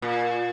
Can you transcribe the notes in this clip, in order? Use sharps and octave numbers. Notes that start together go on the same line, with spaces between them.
A#2